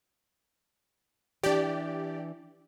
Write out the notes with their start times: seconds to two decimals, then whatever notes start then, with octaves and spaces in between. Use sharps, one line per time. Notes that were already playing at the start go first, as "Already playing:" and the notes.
1.43 E3 D4 G4 D5